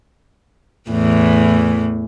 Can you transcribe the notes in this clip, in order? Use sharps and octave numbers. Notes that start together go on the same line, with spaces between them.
E2 A2 E3